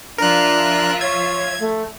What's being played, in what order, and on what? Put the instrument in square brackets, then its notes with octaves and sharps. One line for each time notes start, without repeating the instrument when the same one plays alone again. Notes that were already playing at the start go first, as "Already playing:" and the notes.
[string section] F3 F4 E5 [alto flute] D4 [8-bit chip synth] A#4 F#6
[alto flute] C#5 [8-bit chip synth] G#6
[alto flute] A3